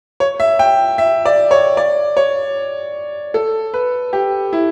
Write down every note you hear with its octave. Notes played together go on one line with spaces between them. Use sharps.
C#5
E5
G5
E5
D5
C#5
D5
C#5
A4
B4
G4
E4